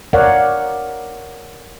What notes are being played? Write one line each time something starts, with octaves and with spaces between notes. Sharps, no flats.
A#4 C#5 D5 F5 F#5